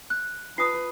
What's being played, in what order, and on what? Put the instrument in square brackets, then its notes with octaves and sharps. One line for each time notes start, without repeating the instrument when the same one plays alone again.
[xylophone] F#6
[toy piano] F4 A5 D#6 [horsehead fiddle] B4 [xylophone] C7